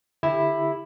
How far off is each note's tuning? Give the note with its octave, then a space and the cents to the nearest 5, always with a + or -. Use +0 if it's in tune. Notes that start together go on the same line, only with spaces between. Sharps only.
D3 +20 E4 +0 G4 +25